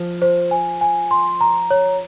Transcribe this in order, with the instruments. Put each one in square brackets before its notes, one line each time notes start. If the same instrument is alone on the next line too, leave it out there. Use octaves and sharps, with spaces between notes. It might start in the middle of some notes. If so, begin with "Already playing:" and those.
Already playing: [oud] F3
[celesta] C5
G#5
G#5
C6
A#5
C#5